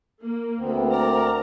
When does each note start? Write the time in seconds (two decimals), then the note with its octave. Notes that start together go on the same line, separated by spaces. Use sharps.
0.22 A#3
0.60 D2 B3 C4
0.91 A#4 D5 A#5